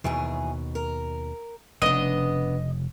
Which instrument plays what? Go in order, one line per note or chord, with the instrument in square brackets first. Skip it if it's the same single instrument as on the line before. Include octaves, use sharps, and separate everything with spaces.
[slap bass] D#2 B2 [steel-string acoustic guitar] E3 F#3 G#4
[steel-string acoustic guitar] A#4
[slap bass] F1 C#3 [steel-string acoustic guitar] B3 D4 [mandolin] D#5